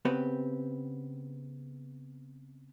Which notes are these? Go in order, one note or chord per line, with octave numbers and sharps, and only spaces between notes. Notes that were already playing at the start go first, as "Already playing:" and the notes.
C#3 B3 C4 G4 B4